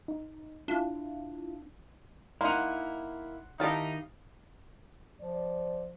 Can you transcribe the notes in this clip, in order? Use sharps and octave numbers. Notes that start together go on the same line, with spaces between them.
D#4
D4 E4 F4
A#3 D#4 E4 F#5 C6
D#3 D#4 E4 G4 F5 A5
F3 D5